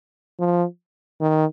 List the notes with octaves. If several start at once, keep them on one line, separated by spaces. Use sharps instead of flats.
F3
D#3